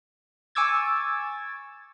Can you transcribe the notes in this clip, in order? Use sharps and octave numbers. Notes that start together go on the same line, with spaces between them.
G#5 C#6 D6 E6 G#6 A6